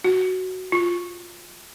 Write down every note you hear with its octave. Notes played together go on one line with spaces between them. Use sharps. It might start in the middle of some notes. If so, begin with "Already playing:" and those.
F#4
F4